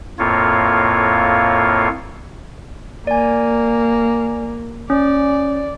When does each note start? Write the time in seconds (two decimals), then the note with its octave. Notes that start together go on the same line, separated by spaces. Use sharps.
0.19 F2 A2 A#3 F4 C#5
3.07 A#3 D5 G#5
4.90 C#4 D5